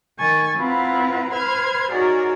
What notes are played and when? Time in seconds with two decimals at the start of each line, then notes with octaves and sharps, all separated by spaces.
0.18 D#3 G#5 C#6 A6
0.57 C4 E4 F4 B4 F#5 A#5
1.30 B4 C5 F6 G#6
1.91 D#4 F#4 G#4 A#4 C#5 D5